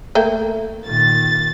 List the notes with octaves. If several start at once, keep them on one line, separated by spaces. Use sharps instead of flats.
A3 A#3 G5
A#2 D#3 A6